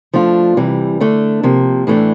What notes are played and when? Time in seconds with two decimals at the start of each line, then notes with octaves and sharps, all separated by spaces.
0.13 F3 A3 D4 F4
0.57 C3 E3 G3
1.00 D3 A3 D4
1.43 C3 F3 A#3
1.87 A2 E3 A3 D4